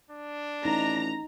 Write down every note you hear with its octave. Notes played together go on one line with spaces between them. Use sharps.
D4
A1 D#4 A#5